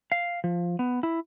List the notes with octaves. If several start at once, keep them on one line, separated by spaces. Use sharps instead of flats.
F5
F3
B3
E4